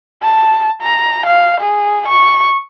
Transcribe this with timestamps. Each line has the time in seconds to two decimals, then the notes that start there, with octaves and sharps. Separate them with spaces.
0.22 A5
0.82 A#5
1.27 F5
1.61 G#4
2.08 C#6